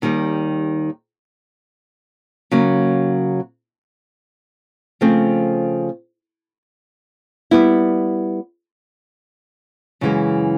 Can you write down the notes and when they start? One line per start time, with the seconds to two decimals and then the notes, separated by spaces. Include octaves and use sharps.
0.02 D#2 D#3 G3
2.51 C#3 F#3 A#3
5.01 C#3 F3 A3 C4
7.51 G3 B3 E4
10.01 F#2 C#3 E3 G#3